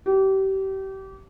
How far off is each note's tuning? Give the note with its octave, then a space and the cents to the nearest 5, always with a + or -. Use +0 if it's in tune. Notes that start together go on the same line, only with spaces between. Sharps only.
G4 -30